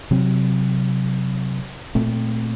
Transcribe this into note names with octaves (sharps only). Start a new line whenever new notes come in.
C3 F#3 C4
A#2 A3 C4